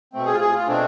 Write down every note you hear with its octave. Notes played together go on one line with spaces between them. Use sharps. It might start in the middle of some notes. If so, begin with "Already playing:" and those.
B2 A3 C4
G#4
F4
G#4
F4
B2 A3 C4 D4